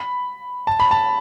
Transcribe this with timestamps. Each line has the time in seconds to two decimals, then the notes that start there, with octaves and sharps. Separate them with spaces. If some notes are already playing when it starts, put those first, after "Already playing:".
Already playing: B5
0.67 A5
0.80 B5
0.91 A5